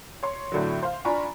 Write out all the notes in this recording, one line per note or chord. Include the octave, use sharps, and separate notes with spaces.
C#5 C6
A2 D3 F#3
C5 F5
D4 F4 G#5 A#5 B5 C#6